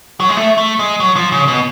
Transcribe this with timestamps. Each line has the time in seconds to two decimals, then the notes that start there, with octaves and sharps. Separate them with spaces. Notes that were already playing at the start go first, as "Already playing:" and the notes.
0.20 F#3
0.29 G#3
0.36 A3
0.58 A3
0.79 G#3
1.00 F#3
1.16 F3
1.32 C#3
1.48 B2